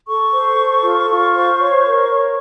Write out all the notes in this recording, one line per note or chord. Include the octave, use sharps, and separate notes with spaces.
A4 C#6
C5
A4
F4
F4
C5
C#5
A#4
C#5